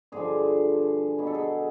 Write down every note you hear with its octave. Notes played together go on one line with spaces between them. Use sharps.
G2 D3 F3 G#4
B2 F#3 G#4
A4
G#4